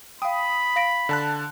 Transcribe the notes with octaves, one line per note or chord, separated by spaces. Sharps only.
F5 G5 B5 D#6
F5 A#6 D7
D3 A5 F#6